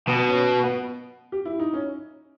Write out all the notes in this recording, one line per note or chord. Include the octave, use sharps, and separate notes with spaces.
B2 B3
C#4
B3
G4
E4
D#4
C#4